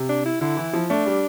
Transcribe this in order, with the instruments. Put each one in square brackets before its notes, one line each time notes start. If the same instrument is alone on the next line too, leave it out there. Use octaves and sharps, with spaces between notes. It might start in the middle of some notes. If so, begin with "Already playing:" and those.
Already playing: [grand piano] C3
[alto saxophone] D4
E4
[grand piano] D3 [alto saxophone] E4
[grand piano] E3
F3
[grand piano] A3 [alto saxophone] D4
[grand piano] G3